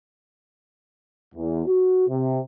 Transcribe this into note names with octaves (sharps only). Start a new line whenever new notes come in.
E2
F#4
C3